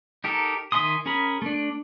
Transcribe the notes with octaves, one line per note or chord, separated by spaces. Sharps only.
D#4 G4 A4 A#4
D#3 E5 G#5 C6 D#6
C#4 G#4 A#4 B5
A3 D4